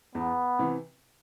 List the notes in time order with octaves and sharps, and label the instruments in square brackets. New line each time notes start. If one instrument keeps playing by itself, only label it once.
[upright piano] E2 [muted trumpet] B3
[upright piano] C3 E3